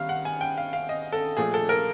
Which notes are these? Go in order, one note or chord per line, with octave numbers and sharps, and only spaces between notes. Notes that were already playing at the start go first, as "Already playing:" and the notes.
Already playing: D#3 G3 B3 F5
F#5
G#5
G5
F5
F5
D#5
A4
A#2 F3 A3 G#4
A4
A#4